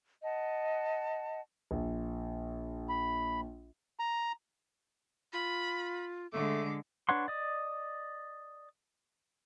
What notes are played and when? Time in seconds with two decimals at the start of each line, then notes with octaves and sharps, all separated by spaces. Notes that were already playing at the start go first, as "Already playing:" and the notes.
0.22 D#5 F#5 A5
1.71 A#1
2.89 B5
4.00 A#5
5.33 F4 B5
6.33 D3 G#3 A3 D6
7.09 D4 B4 C#5 F#5 C6
7.28 D5 D#5